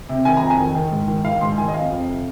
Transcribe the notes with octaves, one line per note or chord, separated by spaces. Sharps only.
C3
D#3 G#5
A#5
F2
G#5
D#3
D#3
G#2
D#3
D#3 F5
G#2 C6
D#3 G#5
D#5
F2 F5
F2
C3